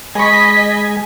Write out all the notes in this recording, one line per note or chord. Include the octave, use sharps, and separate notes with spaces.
G#3 D#5 G#5 B5 C#6 B6